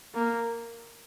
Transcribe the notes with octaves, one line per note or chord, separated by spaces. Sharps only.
A#3